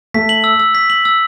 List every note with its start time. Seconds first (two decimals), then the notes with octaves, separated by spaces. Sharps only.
0.14 A3 B6
0.29 F#7
0.44 E6
0.60 E6
0.75 B6
0.90 F#7
1.05 E6